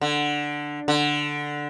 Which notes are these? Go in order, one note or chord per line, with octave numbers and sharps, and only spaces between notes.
D3
D3